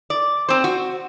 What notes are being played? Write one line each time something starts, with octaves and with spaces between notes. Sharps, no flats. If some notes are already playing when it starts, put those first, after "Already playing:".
D5
C4 C5
F#4